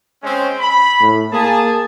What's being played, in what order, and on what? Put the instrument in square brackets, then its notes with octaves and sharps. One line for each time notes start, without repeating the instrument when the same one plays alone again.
[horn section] G#3 C4 C#4
B5
[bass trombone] A2
[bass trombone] A#3 [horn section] G#4 A5